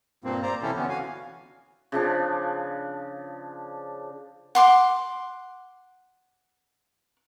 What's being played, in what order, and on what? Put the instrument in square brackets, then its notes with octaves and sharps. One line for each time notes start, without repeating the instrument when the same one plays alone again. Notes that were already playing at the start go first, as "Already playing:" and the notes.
[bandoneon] G2 A#2 A#3 C4
C5 D5 A#5
C3 E3 C#4 E4 G4 A4
D3 E3 B3 C#4
F#4 F5 G#5
[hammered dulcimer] C#3 F3 D4
[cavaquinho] F#5 C6 D6